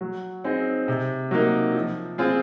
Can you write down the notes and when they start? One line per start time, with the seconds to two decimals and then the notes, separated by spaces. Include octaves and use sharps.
0.01 F#3
0.44 C4 D#4 G#4
0.88 C3
1.31 F#3 A#3 D#4
1.75 F3
2.18 C4 F4 G#4